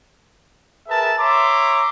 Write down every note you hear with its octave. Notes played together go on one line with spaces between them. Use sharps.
G#4 A#4 B4 E5 A5
C#5 E5 A#5 C6 D6